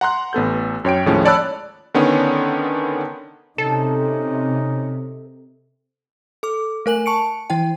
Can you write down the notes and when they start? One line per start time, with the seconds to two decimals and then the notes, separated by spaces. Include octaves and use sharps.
0.01 F#5 A#5 C6 F#6
0.33 A1 B3 A4 G6
0.85 F#2 C#5 G5 D7
1.06 D#2 A2 F3 G#3 C#4
1.25 C#5 D5 A5 B5 E6 F#6
1.94 D3 D#3 B3 C#4
3.58 C3 C#4 D#4 A4
6.43 A4 D6
6.86 A3 A#4 G#5 F#7
7.06 A5 C#6 C#7 D7
7.50 E3 E4 G5